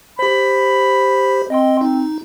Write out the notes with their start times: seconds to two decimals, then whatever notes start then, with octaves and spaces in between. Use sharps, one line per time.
0.19 G4 C5 B5
1.50 C4 D#5 G5 C6
1.81 D#4